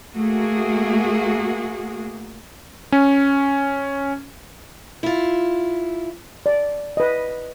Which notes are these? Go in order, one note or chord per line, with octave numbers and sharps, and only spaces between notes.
A3 A#3 F#4 G#4
C#4
E4 F4
D5
B4 D#5